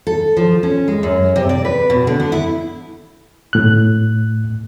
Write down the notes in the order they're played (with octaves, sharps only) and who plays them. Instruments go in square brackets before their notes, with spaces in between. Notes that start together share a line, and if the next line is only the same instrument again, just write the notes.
[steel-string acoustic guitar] A4
F3
C#4
G#3
F#2
C3
D5
B4
B2
D3
B3
E4
[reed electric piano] A2 F#6